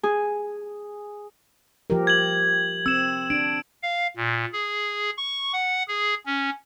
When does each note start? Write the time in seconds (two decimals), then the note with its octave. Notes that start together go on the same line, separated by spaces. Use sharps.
0.03 G#4
1.90 F3 G4 A#4
2.07 G#6 F#7
2.86 C4 E6 E7
3.30 D4 D7
3.83 F5
4.17 A#2
4.53 G#4
5.17 C#6
5.53 F#5
5.88 G#4
6.26 C#4